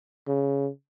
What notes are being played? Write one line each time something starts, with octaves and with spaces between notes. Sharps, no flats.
C#3